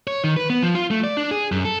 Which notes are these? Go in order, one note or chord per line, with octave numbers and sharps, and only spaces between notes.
C#5
D#3
B4
B3
F3
F4
A3
D5
D4
G#4
F#2
A4